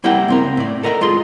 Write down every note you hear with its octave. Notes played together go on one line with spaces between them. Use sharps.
G3 A#3 E4 A#4 F#5 G5
C#2 C4 A#4
A2 D5
A4 A#4 D#5 F5 A#5
G#3 F4 G#4 C6